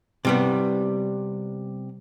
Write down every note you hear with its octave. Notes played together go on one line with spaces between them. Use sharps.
C3 G3 B3